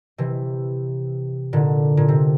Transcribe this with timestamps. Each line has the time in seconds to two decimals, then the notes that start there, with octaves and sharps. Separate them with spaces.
0.18 C3 E3
1.53 A#2 D3
1.97 A#2
2.08 C3